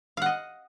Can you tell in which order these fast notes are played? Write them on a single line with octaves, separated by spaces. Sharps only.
F5 F#5 D#5